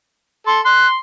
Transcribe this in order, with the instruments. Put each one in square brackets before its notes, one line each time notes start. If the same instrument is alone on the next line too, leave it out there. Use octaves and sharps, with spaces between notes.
[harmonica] A4 [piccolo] C6
[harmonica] C6 [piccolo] F#6